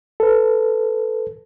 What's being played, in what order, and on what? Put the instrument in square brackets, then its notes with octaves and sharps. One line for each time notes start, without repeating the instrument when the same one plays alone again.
[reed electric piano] A4 B4